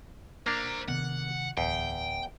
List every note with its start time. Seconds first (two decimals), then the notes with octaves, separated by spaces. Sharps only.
0.46 A#3 D4 C5 A#5
0.88 C3 D#3 B3 F#5
1.58 D1 E2 G5